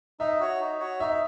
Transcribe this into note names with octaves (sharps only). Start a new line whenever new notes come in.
D#4 E5
F#4 C#5
D#4
F#4 C#5
D#4 E5